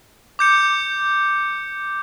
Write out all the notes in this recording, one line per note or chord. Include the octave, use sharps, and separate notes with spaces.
D6 G6 C#7